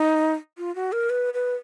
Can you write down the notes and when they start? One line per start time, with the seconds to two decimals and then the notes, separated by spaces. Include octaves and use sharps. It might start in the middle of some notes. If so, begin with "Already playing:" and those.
Already playing: D#4
0.58 F4
0.76 F#4
0.92 A#4
1.10 B4
1.34 B4